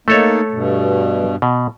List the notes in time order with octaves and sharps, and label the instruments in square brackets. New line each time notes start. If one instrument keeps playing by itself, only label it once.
[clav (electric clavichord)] A3 A4 C#5 [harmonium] A#3 D#4
[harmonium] G2 B2
[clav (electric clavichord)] B2